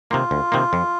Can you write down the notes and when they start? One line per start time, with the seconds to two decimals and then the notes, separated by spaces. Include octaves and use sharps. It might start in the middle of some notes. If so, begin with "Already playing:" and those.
0.11 C3 D#3 A#3 F4
0.31 D2
0.52 C3 D#3 A#3
0.73 F2